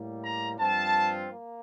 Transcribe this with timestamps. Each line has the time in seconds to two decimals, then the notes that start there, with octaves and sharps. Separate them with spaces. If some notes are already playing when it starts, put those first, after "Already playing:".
Already playing: A2 G3 A#3
0.23 A#5
0.59 G2 F3 C4 F4 A5
1.32 A#3